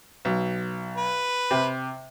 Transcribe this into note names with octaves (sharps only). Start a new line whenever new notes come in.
B1
B4
C3